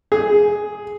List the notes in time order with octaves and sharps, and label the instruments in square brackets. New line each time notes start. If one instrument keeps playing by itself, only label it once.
[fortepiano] G#4